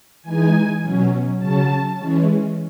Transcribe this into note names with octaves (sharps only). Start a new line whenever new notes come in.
E3 G#3 D#4 G#5
B2 F#3 C#4
C#3 F#3 C#4 A5
E3 G#3 C#4